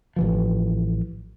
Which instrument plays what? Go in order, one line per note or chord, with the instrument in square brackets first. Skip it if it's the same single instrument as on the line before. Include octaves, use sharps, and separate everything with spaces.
[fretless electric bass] A1 E3 F3